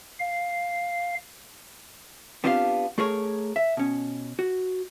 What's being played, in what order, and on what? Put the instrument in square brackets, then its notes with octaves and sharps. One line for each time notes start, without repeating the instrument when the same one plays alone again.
[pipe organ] F5
[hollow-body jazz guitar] B3 C4 D4 F4 G4 F5
A3 G#4 A#4 C#5
E5
B2 C#4
F#4